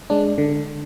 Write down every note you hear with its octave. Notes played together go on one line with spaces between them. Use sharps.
G#3 D4
D3